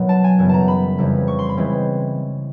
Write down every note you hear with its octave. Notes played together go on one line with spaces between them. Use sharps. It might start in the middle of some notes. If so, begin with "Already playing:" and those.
Already playing: B2 D#3 F#3 B3
A5
G#5
F#2 C#3 E3 G3 B3
A5 A#5
B5
F2 C#3 E3 G3
C#6
C6
B5
C#3 E3 G#3 C4